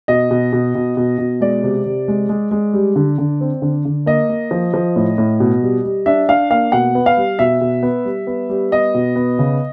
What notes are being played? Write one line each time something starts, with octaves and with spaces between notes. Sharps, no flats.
B2 D#5
B2
B2
B2
B2
B2
G#3 D5
C3
C3
G#3
G#3
G#3
G3
D3
D3
C4
D3
D3
A#3 D#5
A#3
F3
F3
A2
A2
B2
G3
G3
D4 E5
D4 F5
A#3 F5
B2 F#5
B3
F5
G3
B2 E5
B2
B3
G3
B3
G3
B3 D#5
B2
B3
C#3